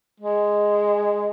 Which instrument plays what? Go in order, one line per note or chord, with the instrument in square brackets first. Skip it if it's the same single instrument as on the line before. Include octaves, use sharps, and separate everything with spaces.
[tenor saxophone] G#3